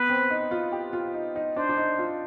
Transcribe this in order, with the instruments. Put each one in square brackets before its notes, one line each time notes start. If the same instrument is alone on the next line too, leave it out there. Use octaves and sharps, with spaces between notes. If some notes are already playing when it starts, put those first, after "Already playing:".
Already playing: [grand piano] B3 [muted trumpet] B4
[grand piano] C4
D#4
F4
G4
F4
D#4
D#4
[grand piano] D4 [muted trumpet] C5
[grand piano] D4
D#4
F4